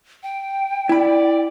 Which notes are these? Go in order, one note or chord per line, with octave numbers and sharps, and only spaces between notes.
G5
E4 D5 B5